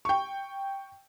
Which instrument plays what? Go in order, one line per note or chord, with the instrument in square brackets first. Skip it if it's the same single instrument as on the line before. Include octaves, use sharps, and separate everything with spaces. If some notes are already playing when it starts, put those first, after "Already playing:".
[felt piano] G5 C#6